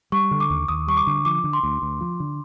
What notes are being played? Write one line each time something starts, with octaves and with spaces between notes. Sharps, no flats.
G3 C#6
D3
D6
D#2
D#2 D#6
G3 C#6
D6
D3
F3 D6
D3
C6
D2
D2
F3
D3